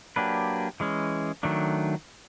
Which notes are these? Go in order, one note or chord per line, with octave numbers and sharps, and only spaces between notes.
F#3 A#3 D4 G4 B4
E3 G#3 C#4
D#3 F#3 A3 D4